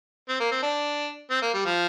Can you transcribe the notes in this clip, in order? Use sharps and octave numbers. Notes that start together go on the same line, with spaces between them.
C4
A#3
C4
D4
C4
A#3
G3
F3